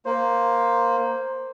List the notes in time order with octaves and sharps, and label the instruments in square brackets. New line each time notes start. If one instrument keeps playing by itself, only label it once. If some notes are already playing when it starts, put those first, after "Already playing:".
[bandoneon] A#3 [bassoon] C5